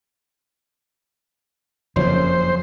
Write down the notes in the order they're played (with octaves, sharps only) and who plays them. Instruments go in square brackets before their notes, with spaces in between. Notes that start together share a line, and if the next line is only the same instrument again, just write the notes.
[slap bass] F#1 A#2 [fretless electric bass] F2 [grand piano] C#3 F#3 C#4 [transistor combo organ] C5